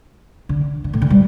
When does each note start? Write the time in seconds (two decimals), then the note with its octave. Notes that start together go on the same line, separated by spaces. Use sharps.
0.49 D3
0.84 D3
0.93 A2
1.02 D3
1.10 G3